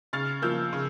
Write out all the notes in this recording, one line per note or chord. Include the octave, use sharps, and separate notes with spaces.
C#3 F6 A6
F3 A#3 E6 G6
C#3